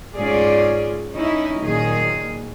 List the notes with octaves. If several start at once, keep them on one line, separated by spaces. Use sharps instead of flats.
G#2 C#4 F4 G#4 D5
C#4 D#4 E4
A#2 D#3 F#3 A#3 G#4